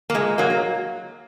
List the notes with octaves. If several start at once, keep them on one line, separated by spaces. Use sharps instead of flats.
A#3
A#2 G#3
F#3 A#3
F#3